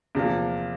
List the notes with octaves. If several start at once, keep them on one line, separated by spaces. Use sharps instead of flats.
E2 C3 F3 A#3